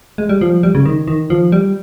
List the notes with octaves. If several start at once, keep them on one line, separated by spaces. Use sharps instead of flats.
G#3
G3
F3
G3
C#3
D#3
D#3
F3
G3